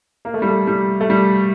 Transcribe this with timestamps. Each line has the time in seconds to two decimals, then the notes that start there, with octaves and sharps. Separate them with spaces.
0.25 A#3
0.34 A3
0.42 G3
0.49 A3
0.67 G3
1.01 A3
1.10 G3